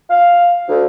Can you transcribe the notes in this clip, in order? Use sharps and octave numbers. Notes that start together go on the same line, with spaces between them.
F5
D2